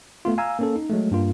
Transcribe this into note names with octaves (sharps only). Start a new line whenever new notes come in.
A3 B3 F4
F5 G#5 A#5 E6
A#3 C#4 A4
D#4
F#3 G#3 A3
G2 A#3 F4